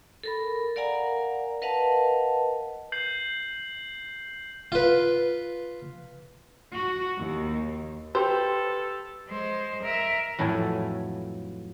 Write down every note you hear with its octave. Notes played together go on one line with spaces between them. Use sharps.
A4 A#4 B5
A#4 D5 F5 F#5 G#5 A#5
A#4 B4 D#5 F5 F#5 A5
G6 C7 F#7
F4 B4
F#4
D#2
G4 A4 B4 C5 C6
G#3 C5
A#4 E5
F2 A2 E3 F#3 A4 G#5